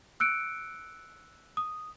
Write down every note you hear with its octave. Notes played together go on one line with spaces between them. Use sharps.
E6 F#6 C#7 D7
D#6